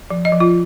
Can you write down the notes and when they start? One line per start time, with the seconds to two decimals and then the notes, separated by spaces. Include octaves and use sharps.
0.10 F3
0.25 D#5
0.32 F3
0.40 F4